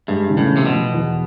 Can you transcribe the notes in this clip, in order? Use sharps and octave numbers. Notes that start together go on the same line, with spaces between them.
G2 G#3
C#3
A2
F3
C3
B2
F3
E2